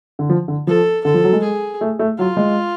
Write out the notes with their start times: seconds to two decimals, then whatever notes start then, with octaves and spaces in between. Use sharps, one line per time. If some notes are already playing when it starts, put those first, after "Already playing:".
0.19 D3
0.29 F3
0.48 D3
0.67 F3 A4
1.04 D3 A4
1.14 F3
1.24 F#3
1.33 G#3
1.43 G#4
1.81 A3
1.99 A3
2.18 F#3 F4
2.37 G#3